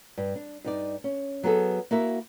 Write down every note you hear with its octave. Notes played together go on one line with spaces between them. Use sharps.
G2
D4
G2 D#4 D5
C#4
F#3 B3 G#4 A4
A#3 E4 F#4 A#4 E5